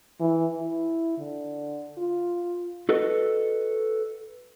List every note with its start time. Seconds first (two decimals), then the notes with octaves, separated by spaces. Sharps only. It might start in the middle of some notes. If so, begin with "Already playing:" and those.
0.20 E3
0.61 E4
1.18 D3
1.97 F4
2.89 F#4 A4 B4 D#5